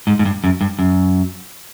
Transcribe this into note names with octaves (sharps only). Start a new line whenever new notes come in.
G#2
G#2
G2
F#2
G2
F#2